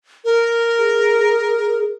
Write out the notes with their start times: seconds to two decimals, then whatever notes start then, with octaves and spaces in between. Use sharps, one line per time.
0.25 A#4
0.79 G#4